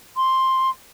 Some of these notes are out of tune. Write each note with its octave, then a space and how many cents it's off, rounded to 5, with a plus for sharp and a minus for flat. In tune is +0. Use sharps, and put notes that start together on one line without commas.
C6 +5